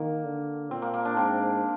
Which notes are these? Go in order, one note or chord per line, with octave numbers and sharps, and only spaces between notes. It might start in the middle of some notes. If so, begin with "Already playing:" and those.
Already playing: D#3 A#3
D3
A#2 C4
A#3
A#3
D4
G#2 C4